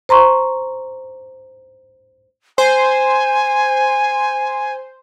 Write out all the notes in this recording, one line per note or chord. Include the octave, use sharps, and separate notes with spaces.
C5 A#5 C6 C#6
C5 G#5